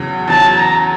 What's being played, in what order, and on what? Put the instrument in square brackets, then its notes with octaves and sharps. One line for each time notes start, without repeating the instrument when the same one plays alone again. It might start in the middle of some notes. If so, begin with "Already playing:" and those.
Already playing: [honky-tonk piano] E2 C#3 F#3
[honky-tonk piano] E2 C#3 F#3 [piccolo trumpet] A5
[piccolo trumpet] A#5